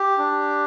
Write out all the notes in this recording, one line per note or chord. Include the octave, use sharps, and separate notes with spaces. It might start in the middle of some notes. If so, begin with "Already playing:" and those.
Already playing: G4
D4